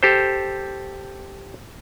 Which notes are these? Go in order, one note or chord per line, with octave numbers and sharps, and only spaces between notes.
G4 A4 C5